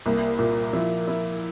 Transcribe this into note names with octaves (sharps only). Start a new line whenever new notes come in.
C2 A#3
A#2
F3 E4
E4